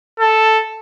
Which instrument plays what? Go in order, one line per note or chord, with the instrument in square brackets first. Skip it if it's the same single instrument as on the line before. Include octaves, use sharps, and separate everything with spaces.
[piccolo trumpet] A4